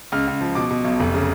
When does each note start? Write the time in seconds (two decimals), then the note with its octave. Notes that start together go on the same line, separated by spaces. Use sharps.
0.12 C#2 F6
0.27 C#2
0.41 F3
0.55 B2 D6
0.71 B2
0.84 B1
1.00 F1
1.14 C#3